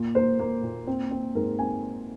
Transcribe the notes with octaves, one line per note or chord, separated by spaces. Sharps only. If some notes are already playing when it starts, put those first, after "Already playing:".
Already playing: A#2
A#3 C5
A#3
A#2
C4
C4
G#2 A#4
C4 G#5